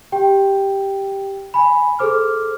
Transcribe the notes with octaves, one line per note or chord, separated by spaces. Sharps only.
G4 G5
G#5 B5
G#4 A4 C5 D6 F6